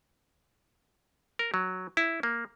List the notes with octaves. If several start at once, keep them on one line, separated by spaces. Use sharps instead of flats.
A#4
F#3
E4
A#3